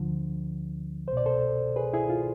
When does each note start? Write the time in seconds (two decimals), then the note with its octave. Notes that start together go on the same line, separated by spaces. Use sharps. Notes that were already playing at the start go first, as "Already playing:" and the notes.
Already playing: D2 D3 F3
1.07 C2 C5
1.13 B2 D5
1.26 A4 C5
1.76 G#4 B4
1.93 E4 G#4
2.09 F4